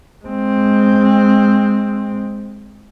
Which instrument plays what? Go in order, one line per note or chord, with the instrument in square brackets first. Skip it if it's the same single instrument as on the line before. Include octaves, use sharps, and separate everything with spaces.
[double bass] G#3 C4